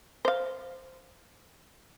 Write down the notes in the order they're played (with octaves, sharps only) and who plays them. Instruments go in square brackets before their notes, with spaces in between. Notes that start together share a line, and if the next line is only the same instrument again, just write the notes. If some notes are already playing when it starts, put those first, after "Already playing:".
[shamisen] C5 F5